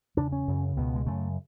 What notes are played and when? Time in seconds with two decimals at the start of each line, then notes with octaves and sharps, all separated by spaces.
0.17 E2 C#3 D4
0.32 C#4
0.47 F#2 C#3
0.76 C#2 B2 B3
0.95 G#3
1.06 F#2 C#3 A3